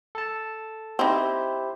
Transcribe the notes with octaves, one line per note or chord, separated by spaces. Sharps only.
A4 A5
C4 D#4 E4 G4 C5